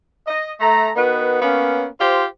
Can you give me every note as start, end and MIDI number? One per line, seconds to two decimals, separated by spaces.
0.27 0.52 75
0.60 0.90 57
0.60 0.90 82
0.96 1.40 51
0.96 1.40 59
0.96 1.40 66
0.96 1.40 71
0.96 1.40 75
1.42 1.86 58
1.42 1.86 59
1.42 1.86 61
2.00 2.26 65
2.00 2.26 67
2.00 2.26 72